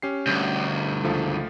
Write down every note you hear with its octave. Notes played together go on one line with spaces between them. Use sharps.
C#4 G4 C7
D2 G2
C#2 F3 A3